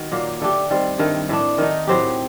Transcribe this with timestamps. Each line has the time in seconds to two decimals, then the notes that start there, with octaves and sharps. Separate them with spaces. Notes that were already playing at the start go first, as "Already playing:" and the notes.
Already playing: D#3 F#4
0.11 A#2 F#3 A#3
0.41 D3 A3 D4 G4
0.70 D#3 G3 C4
0.98 G2 D#3 A3
1.29 A2 A3 D4
1.58 D#3 A3 D#4
1.87 A2 F#3 C4 G4